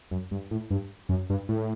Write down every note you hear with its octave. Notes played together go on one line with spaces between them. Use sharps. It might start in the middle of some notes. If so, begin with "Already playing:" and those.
F#2
G2
A2
G2
F#2
G2
A2